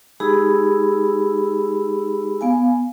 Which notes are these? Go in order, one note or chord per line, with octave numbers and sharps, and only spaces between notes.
G#3 D#4 G4 G#4 B5 E6
B3 F5 G#5